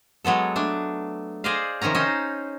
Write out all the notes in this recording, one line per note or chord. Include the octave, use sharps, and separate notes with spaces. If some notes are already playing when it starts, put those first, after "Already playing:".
F#3 G#3 B3 A4
A3 D4
G#4 C5 D5 D#5 F5
C3 D#3 F3 C#4 A#5
C#4 D#4 C5